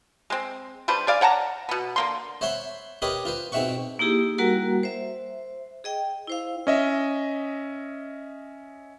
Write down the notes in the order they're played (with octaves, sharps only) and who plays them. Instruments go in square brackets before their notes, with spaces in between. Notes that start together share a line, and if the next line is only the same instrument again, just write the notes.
[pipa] G#3 C4
G3 D4 B4 C5
G#4 D5 F5
C#5 F#5 A5 A#5
B2 B3
D3 A#3 C6
[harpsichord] C5 C#5 E5 F#5 B5 C6
G4 A#4 B4 C#5 D#5 B5
F4 B4 C5
G#2 B2 C4 E5 F#5 C#6
[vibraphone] A#3 D#4 E4 G4 G#4
G3 A#3 F#4 A#4 F#5 A#5
C5 E5
G#4 D#5 G5
E4 C5 F5
[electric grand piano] C#4 D#5 E5